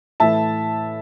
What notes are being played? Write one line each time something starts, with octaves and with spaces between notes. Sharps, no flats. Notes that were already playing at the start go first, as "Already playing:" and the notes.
A2 E3 A3 E4 E5 A5